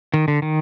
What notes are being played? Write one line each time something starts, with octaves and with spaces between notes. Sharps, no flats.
D#3
D3
D#3